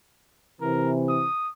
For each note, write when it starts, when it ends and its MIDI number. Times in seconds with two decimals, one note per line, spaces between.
0.61 1.25 48
0.61 1.25 52
0.61 0.91 70
1.09 1.49 87